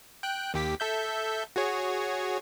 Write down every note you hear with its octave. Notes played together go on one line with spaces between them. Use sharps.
G5 F#6
D#2 G4 B6
A4 E5 G6
F#4 G#4 C#5